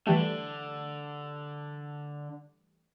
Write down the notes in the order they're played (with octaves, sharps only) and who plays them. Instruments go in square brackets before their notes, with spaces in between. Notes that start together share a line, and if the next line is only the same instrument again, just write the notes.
[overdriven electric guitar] D3 [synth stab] E3 G3 A3